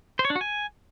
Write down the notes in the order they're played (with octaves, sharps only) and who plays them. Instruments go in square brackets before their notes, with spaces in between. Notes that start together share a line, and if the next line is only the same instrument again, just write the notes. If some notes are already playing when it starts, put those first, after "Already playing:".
[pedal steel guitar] C5
C#5
D4
F#4
G#5